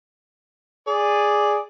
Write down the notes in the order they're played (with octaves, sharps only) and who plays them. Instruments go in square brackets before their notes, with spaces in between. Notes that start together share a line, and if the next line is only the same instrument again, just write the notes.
[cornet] G#4 [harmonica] D5